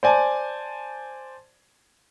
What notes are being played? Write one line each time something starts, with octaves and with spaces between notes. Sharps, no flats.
C5 D5 G#5 A5